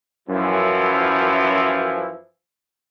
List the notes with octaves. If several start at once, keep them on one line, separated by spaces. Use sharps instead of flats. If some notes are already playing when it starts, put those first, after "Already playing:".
F#2 E3 F3 E4